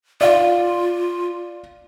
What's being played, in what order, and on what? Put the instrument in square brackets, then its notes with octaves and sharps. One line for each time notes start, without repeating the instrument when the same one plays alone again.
[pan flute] F4 [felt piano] D5 F5